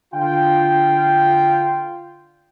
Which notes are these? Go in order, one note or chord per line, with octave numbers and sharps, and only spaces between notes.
D3 F4 G5